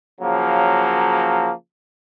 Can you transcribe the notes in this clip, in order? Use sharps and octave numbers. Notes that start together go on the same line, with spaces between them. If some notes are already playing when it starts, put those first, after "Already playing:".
C#3 F3 F#3 A#3